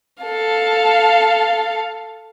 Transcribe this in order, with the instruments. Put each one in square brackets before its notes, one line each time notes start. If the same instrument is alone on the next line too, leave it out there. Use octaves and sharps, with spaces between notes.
[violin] A4 F5